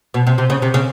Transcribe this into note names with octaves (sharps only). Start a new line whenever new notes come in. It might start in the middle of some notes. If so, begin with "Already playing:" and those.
B2
C3
C3
C#3
C3
C#3